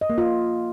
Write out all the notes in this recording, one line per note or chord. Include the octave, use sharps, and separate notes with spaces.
D#5
A#3
F4